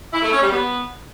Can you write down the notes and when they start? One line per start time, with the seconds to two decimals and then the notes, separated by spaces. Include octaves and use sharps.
0.13 E4
0.23 A3
0.32 C#4
0.42 G3
0.52 B3